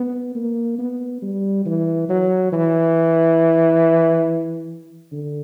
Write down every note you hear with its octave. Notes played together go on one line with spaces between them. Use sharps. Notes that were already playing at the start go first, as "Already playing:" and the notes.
Already playing: B3
A#3
B3
G3
E3
F#3
E3
D3